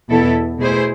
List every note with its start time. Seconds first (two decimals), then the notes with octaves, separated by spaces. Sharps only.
0.10 E2 B2 B3 E4 A4
0.58 B2 A3 E4 G#4 C5